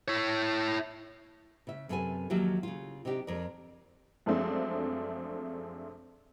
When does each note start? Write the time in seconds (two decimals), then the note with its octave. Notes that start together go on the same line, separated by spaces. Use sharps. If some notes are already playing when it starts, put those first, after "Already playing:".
0.08 E4 C#5
1.67 C#3 E5
1.89 F#2 C3 A4 B4 G5 G#5
2.30 D#2 F3 F#3 G4 E5
2.63 C#3 F4
3.05 C3 C4 D4 D#4 G4
3.27 F2 A#4 D5
4.26 F#2 F3 G#3 A3 C4 D4